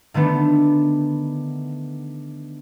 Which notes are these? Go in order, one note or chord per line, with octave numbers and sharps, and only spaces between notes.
D3 D#3 A3 B3 D4